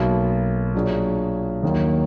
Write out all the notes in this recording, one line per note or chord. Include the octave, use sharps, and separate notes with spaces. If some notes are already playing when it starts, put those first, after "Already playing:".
Already playing: B1 B2 A#3
A#2 F#3 D4 G#4
D#2 D#3 F#3 A#3